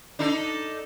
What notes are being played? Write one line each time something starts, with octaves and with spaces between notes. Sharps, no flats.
D4 D#4 A4